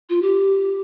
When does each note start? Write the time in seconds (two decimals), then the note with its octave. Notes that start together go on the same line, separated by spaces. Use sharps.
0.09 F4
0.22 G4